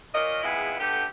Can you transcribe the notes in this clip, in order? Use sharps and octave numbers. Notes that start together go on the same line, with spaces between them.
A#2 A#4 C#5 D#5
F2 G#3 B3 E4 G#4
D3 A3 B3 G4